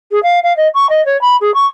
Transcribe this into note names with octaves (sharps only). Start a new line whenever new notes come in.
G#4
F5
F5
D#5
C#6
D#5
C#5
B5
G#4
C#6